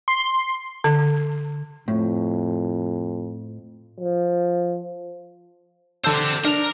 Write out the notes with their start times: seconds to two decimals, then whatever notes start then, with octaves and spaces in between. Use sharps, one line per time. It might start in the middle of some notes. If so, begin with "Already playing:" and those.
0.08 C6
0.84 D3
1.88 F2 A2
4.00 F3
6.04 D3 G4 C5 A5 E6
6.45 D4 A#4 A#5